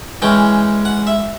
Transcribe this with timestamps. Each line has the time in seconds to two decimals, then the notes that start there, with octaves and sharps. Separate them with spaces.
0.22 E3 G#3 C#4 G5
0.85 F#5
1.07 E5